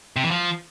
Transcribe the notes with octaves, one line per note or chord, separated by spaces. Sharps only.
C3
E3
F3